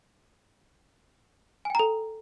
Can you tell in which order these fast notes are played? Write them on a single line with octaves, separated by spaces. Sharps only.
G#5 G5 A#5 A4